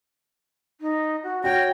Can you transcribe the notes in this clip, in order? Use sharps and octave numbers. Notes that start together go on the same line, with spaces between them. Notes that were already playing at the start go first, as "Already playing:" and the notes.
D#4
F#4
F#4 C#5 G5 A#6